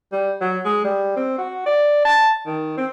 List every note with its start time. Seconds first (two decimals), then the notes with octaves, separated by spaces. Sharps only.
0.12 G3
0.41 F#3
0.65 G#3
0.85 G3
1.16 C4
1.38 F#4
1.66 D5
2.05 A5
2.46 D#3
2.77 C4